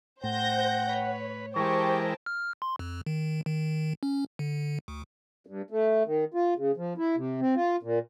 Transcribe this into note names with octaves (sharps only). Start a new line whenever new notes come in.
A2 C5 F#5 G5 G6 A#6
B4 C#5
E3 G#3 G4 A#4 C5 G5 A5 C#6
F6
C6
F2
D#3
D#3
C#4
D3
D2
G2
A3
D#3
F4
C#3
F3
E4
C3
C4
F4
A#2